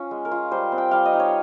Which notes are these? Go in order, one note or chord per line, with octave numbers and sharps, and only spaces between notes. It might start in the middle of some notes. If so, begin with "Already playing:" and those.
Already playing: C#4 F4
G#3
A#4
F4
G3 C5
C4
G5
G3 F5
D#5
D#4
C#5